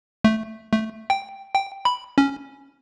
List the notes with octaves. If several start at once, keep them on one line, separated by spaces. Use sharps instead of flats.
A3
A3
G5
G5
B5
C#4